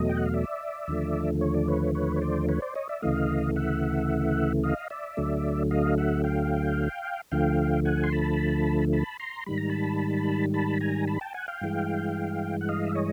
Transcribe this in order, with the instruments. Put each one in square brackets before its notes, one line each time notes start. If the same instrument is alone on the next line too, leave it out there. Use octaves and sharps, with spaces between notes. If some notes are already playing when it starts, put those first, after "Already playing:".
Already playing: [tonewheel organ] E2 B2 F#3 A3 D#5
G5
F#5
F5
D5 E5
D#2 D3 F3 A3
C#5
D5
B4 C#5
B4 C#5
C#5
C5 D5
B4 C#5
C5 D5
C#5 D#5
D5 E5
D2 C#3 E3 A3 D#5 F5
E5 F#5
D#5 F5
D5 E5
D2 D3 F#3 A3
D#5 F5
E5 F#5
F5 G5
D2 D3 F3 A3 F5 G5
F#5 G#5
C6
A5 B5
A5 B5
A#5 C6
G#2 D#3 G3 B5
A#5
A5 B5
A5 B5
G#5 A#5
A5 B5
G5 A5
F#5 G#5
F5 G5
G2 E3 G#3
F#5
D#5 F5
E5
C#5 D#5